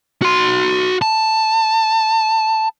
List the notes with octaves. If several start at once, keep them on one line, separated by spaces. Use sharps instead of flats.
F#4 C6
A5